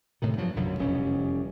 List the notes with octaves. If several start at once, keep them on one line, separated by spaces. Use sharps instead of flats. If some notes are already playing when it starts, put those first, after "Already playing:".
A2 C3 D#3
G2 F3 F#3
B1 F#2 D3 F#3
F1 E2 G3 C#4